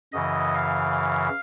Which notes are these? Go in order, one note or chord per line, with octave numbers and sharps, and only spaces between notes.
F#2 C#3 E3 D#5
F5